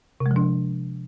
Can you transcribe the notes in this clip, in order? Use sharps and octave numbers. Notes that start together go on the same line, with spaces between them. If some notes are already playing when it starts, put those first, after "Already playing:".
C3
G#3
F3
D4